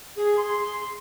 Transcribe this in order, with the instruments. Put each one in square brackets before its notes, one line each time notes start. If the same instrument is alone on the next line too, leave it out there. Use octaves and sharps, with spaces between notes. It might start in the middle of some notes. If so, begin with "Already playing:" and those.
[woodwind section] G#4
C6